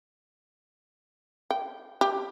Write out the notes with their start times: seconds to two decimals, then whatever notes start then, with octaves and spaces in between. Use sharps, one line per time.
1.51 G5
2.01 G4